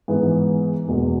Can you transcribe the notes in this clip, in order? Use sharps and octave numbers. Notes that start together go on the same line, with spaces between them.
G#2 E3 B3
E2 B2 G#3